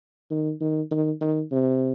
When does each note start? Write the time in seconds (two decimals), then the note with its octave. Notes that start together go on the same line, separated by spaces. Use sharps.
0.31 D#3
0.61 D#3
0.91 D#3
1.21 D#3
1.52 C3